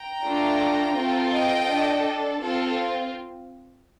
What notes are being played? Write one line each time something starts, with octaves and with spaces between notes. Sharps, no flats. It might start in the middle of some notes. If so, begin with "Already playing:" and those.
Already playing: G5 A#5
A3 D4 F4 A4
C4 F4 A4
D#5 G5
D4 A4
C4 F4 A4